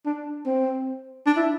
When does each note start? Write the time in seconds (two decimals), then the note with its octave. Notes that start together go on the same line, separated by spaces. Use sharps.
0.06 D4
0.46 C4
1.26 D4
1.37 E4